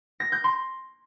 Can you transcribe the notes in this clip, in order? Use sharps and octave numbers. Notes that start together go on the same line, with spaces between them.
A#6
G6
C6